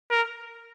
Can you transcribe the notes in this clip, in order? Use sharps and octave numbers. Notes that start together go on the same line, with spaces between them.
A#4